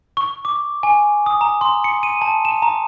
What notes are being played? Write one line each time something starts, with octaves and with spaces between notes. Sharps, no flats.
C#6
D6
G#5
D#6
A#5
C6
C#7
D#7
A5
E7
A#5